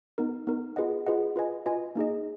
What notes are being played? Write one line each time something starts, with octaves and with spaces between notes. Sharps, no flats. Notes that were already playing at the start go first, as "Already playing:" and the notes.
B3 D#4 A#4
B3 D#4 A#4
F4 G#4 B4 D#5 F#5
F4 G#4 B4 D#5 F#5
F4 B4 D#5 G#5
F4 B4 D#5 G#5
A#3 D#4 G#4 D#5